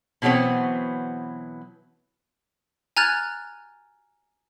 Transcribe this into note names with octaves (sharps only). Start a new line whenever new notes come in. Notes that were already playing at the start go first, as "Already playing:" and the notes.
B2 E3 F#3 B3 C4
G#5 A#5 F6 F#6 G#6 A6